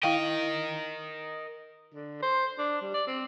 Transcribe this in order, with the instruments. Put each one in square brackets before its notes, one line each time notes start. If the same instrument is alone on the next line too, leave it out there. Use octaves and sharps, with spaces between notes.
[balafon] E4 F5 G5 [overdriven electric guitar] A#4 D#5
[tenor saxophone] D3
C5
D4
G3
D5
C4